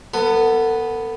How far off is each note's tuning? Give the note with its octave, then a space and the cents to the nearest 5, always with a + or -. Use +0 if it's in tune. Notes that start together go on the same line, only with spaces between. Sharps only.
B3 +0 A4 +40